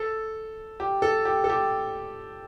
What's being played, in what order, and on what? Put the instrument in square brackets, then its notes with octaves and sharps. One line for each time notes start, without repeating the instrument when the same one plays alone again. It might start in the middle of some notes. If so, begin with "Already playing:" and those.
Already playing: [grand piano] A4
G4
A4
G4
A4
G4